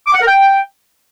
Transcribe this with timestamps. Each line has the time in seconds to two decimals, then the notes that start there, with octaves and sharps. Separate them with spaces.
0.07 D6
0.14 F#5
0.21 A#4
0.28 G5